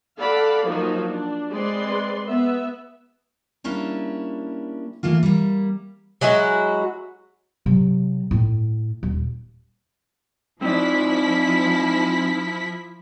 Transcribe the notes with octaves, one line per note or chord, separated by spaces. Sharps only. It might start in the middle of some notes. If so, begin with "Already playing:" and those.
A4 D5 F5 F#5 B5
F3 F#3 A#3 D#4 F#4
D4
G#3 C4 B4 D5 C6
B3 E5
G3 A#3 C#4 D4 E4 G4
E3 A3 A#3 F4
G3 A#3
F#3 G#3 E4 F#4
C3 F#3
A2
D#1
F3 C4 D#4 E4 D5 B6